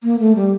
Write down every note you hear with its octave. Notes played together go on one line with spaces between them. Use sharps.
A#3
A3
G3